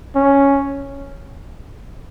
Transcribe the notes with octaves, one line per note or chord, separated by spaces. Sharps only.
C#4